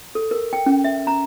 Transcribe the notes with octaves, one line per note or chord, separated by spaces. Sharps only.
A4
A#4
G5
C#4
E5
A#5